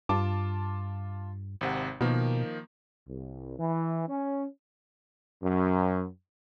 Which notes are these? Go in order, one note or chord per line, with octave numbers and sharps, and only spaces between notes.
G2 F4 A5 D6
G#1 C3 F#5
B2 D#3 F3 A#3
C2
E3
C#4
F#2